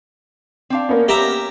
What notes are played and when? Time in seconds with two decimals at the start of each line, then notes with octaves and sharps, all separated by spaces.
0.70 C4 D4 F5
0.89 A#3 B3 C#4
1.08 G4 E5 A#5